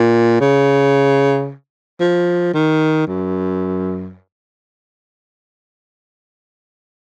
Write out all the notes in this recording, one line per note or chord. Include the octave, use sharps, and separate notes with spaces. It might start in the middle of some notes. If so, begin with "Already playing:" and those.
Already playing: A#2
C#3
F3
D#3
F#2